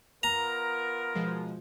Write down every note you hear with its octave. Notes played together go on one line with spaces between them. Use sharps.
B3 F4 A#4 A#5
B2 F3 G#3